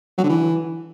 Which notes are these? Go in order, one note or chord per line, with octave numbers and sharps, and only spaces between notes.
F#3
D3
E3